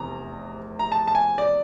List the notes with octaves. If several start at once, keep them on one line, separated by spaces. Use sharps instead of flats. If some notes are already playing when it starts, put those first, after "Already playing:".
Already playing: F1 E2 C3 A#5
A#5
A5
A5
G#5
D5